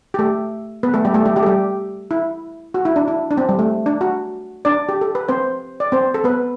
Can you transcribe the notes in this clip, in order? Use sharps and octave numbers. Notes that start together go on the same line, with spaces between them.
G4
A3 A4
B3 B4
A3 A4
G3 G4
A3 A4
G3 G4
G3 G4
A4
G3 G4
E4
F#4
E4
D4
E4
D4
C4
G3
A3
D4
F#4
D4 D5
G4
A4
B4
C4 C5
D5
C4 C5
A4
B3 B4